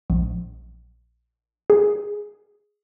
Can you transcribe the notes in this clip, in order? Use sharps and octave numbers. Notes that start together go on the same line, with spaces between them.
A#1
G#4